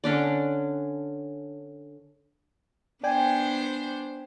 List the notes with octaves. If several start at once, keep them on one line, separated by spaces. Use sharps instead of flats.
D3 C#4 D4 D5
B3 D4 C5 D5 G5 G#5